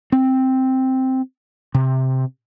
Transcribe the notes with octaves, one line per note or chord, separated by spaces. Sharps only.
C4
C3